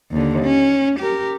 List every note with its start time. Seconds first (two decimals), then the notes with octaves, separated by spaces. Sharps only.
0.12 D#2 D3
0.43 C#4
1.00 G4 A#4